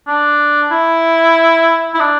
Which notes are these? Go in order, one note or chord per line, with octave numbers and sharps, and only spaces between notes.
D4
E4
E4
D4